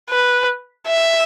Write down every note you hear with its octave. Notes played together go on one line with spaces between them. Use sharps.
B4
E5